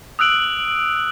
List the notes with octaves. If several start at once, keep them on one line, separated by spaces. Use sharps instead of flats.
D#6 E6 F#6 D7 F#7